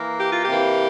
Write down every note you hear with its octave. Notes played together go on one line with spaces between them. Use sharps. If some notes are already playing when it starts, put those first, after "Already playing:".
Already playing: E3 A#3
G4
F4
G4
C3 E3 A#3